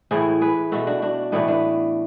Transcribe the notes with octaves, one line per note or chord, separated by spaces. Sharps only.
A2 E3 A3 E4 G#4
G#4 B4
B2 A3 F#4 A4
D4 F#4
D4 F#4
A2 E3 A3 B3 D4
B3 D4